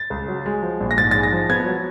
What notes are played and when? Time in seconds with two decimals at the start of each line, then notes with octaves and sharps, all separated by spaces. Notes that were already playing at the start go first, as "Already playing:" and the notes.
Already playing: A6
0.10 C#2
0.28 F#3
0.46 G#3
0.62 F3
0.80 A#1
0.91 A#6
0.98 G#2 A6
1.11 G#3 A6
1.23 A#6
1.32 F3
1.50 B3 G#6
1.66 F#3